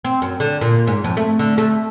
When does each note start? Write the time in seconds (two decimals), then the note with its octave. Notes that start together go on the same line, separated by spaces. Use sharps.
0.05 C4
0.22 F#2
0.40 D3
0.61 A#2
0.87 G#2
1.04 F2
1.17 A3
1.39 D3
1.58 A3